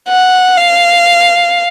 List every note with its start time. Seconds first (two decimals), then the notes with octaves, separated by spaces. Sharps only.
0.08 F#5
0.57 F5